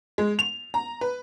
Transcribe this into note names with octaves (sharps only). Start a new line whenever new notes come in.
G#3
F7
A#5
B4